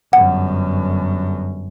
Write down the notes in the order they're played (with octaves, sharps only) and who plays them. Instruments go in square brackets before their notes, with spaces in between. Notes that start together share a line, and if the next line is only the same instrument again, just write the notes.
[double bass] G1 F#2 [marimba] F#5